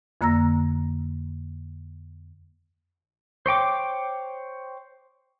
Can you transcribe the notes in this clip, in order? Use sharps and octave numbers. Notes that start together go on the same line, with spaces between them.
F2 D3 A#3 A#5 E6 A#6
C5 C#5 G5 D6